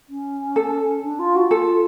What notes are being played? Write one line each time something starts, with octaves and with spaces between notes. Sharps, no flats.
C#4
A4
D4
F4
F#4
F4 A4